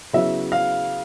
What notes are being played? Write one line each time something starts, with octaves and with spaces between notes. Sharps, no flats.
C#3 F#3 B3 E4 E5
F5